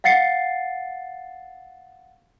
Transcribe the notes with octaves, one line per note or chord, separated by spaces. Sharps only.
F5 F#5 A6 C7 C#7